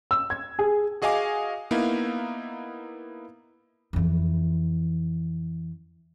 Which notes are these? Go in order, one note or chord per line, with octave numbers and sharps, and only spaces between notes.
E6
G#6
G#4
F#4 G#4 D#5 F5 G#5 D6
A#3 B3 D#4 E4 F5
F2 E3